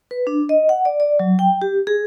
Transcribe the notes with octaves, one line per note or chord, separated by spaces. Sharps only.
B4
D4
D#5
F#5
D5
D5
F#3
G5
G4
G#4